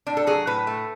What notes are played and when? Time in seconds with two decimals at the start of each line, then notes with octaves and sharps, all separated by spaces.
0.07 A2 D4
0.17 A4
0.27 F#3 G#4
0.47 A2 B4
0.67 A3